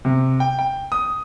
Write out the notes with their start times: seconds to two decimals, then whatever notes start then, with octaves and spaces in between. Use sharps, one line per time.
0.05 C3
0.40 G5
0.59 G5
0.92 D#6